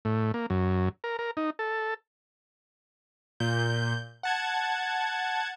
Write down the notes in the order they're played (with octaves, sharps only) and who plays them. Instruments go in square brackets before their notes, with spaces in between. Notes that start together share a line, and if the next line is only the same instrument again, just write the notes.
[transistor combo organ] A2
A#3
F#2
A#4
A#4
D#4
A4
[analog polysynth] A#2 G6
F#5 A5 G#6